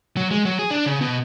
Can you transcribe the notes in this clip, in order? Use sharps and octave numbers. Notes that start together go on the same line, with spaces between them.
F#3
G#3
F#3
G#4
D4
C#3
B2